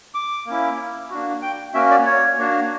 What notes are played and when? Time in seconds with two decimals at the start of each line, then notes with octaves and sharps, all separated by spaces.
0.15 D6
0.47 A#3 C#4 E4
1.10 A#3 D4 F#4
1.42 G5
1.74 A#3 C#4 F#4 E5
1.91 D5
2.06 C#5
2.38 A#3 D4 F#4